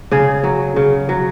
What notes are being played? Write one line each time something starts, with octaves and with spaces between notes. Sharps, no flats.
C#3 G#4
F#3
C#3
F#3